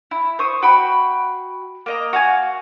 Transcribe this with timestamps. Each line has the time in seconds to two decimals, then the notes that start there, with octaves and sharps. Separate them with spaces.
0.11 E4
0.39 C5 C#6 D#6
0.62 F#4 G5 B5
1.86 A#3 D#5 A#5
2.13 F#4 F5 G#5